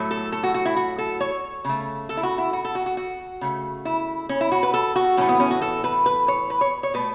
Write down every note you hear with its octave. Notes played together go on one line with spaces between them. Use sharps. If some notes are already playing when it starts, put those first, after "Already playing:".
Already playing: A2 F#3 A3
A4
A4
F#4
F#4
E4
F#4
A4
C#5
C#3 A3
A4
E4
F#4
E4
F#4
A4
F#4
F#4
F#4
C#3 A3
E4
C#4
E4
F#4
B4
A4
F#4
A2 E3 A3 C#4
B3
C#4
F#4
A4
B4
B4
C#5
B4
C#5
C#5
B2 A3 B4